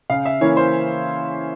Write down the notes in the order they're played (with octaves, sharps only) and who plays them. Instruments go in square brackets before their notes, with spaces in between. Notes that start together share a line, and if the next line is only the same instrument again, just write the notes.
[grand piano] C#3 F5
E5
E3 A#3 C#4 E4 C#5
C5